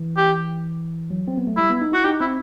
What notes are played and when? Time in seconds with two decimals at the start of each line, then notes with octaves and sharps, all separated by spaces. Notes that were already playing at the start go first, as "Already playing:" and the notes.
Already playing: E3
0.17 G4
1.11 F#3
1.28 C4
1.38 B3
1.47 A3
1.57 G3 E4
1.70 B3
1.81 D#4
1.92 E4 F#4
2.04 D#4 G4
2.21 C4 E4